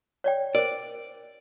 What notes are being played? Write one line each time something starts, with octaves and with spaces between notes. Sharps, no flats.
C#5 D5 G5
A#4 C5 D5